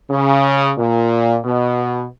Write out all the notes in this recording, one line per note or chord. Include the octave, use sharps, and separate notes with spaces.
C#3
A#2
B2